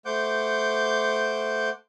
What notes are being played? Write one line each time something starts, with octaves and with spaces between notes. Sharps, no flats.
A3 C5 F#5 D6 G6